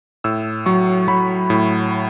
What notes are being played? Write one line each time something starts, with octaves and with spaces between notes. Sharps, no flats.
A2 E6
F#3 C#6
F#3 B5
A2